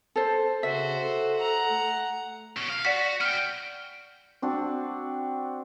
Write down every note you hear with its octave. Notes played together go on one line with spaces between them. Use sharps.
A4 C5
C#3 F#4 C5 E5
A4
F#5 A#5
A3
B2 C#4
F5
F#4 D5 F#5 B6
B3 G5 F6
C4 D4 F#4